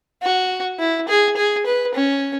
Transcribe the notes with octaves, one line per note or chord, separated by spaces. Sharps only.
F#4
E4
G#4
G#4
B4
C#4